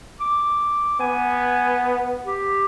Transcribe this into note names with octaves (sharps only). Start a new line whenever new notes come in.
D6
B3 G#5
G4